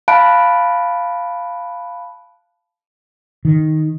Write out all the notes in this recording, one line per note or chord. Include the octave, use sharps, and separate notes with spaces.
F5 A5 B5 F#6 D7
D#3